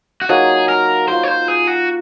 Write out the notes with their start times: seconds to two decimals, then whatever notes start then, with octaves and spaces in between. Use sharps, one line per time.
0.21 F#4
0.29 F#3 A#3 D#4 G#4
0.69 A#4
1.08 A#3 F4 A#4 C5
1.23 C#5
1.28 C5
1.48 G#4
1.67 F#4